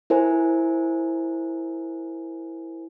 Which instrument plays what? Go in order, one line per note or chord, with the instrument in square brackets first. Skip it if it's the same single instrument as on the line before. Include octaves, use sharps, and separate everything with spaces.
[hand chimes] E4 A#4 C5 G#5